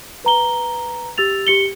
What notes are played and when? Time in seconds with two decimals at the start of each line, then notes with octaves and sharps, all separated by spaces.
0.25 B4 A#5 G7
1.18 G4 E6 A6 F7
1.47 G4 C#7 G7